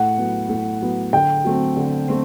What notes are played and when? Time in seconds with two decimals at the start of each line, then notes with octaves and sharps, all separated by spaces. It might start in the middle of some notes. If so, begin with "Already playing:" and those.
Already playing: A2 F#5
0.18 F#3 B3
0.49 A2
0.82 F#3 B3
1.13 D3 G5
1.44 F#3 A3 C4
1.77 D3
2.08 A3 C4